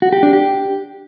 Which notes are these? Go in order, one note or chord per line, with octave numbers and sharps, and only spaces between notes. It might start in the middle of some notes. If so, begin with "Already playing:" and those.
F#4
G4
D4
G4